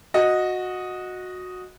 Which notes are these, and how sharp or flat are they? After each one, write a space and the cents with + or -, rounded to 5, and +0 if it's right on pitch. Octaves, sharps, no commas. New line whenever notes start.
F#4 -15 D#5 +0